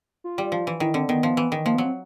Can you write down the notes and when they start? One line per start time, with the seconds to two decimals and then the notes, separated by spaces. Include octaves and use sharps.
0.24 F4
0.38 G3
0.52 F3
0.67 E3
0.80 D#3 E4
0.94 D3 C4
1.08 D#3 B3
1.23 F3
1.37 E3
1.52 D#3
1.65 F3 A#3
1.75 B3
1.78 F#3
1.84 C4